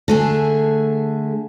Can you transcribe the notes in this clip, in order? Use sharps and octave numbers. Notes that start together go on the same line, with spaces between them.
D3 A3 G#4